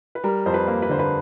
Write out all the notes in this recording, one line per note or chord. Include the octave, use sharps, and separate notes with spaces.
B4
G3 A#4
F2 C5
B4
A#3
B4
D3 C5
B4